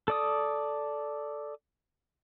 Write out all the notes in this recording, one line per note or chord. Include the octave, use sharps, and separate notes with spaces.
A4 D5 D#6